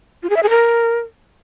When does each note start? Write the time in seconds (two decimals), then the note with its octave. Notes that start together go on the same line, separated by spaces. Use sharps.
0.23 F4
0.30 G#4
0.36 E5
0.43 G#4
0.50 A#4